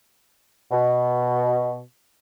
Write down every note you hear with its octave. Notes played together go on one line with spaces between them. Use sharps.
B2